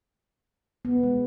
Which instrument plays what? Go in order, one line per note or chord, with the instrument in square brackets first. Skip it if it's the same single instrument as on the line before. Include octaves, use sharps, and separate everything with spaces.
[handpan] B3
G#3